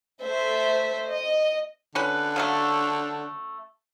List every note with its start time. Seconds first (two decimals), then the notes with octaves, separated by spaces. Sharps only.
0.21 A3 C5 E5
1.08 D#5
1.95 D3 C#4 B4
2.36 C#3 F#3 A3